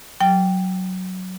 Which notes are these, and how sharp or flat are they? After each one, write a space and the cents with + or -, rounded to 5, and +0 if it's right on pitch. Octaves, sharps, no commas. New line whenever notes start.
F#3 +5 G5 +0